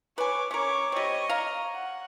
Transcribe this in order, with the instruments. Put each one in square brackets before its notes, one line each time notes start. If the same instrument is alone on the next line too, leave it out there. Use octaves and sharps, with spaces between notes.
[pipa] B4 G#5 [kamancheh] C#5 D6
[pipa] C#4 A#4 [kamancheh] C#5 D6
[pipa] G3 C4 [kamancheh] C#5 D#5
[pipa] F5 A#5
[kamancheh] F#5